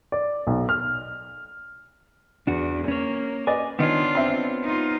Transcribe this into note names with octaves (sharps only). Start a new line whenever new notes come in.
D5
B1
F6
E2 D4 F#4
A#3 C#4 C#5
B4 D5 D#5 G#5
D#3 B3 D4 F4 C#5
C4 E5
D#4 F4